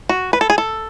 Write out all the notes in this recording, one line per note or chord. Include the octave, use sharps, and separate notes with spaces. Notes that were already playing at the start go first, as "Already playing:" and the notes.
F#4
B4
A4
G#4
A4